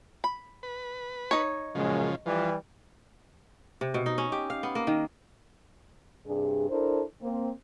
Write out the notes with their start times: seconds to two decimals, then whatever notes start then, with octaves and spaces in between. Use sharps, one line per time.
0.24 B5
0.63 B4
1.31 D#4 C#5
1.75 F#2 A#2 C#3 F3 G#3
2.26 E3 F3 G3
3.81 C3
3.94 B2
4.06 D#4
4.18 C#4
4.32 G4
4.50 F5
4.63 B3
4.75 A#3
4.87 D#3
6.26 G2 C3 D4 G#4
6.70 D4 E4 A4 A#4 C5
7.22 A#3 C4